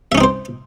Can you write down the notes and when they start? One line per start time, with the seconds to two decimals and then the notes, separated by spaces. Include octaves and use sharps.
0.12 E5
0.15 C#4
0.18 D#4
0.21 C4
0.24 C5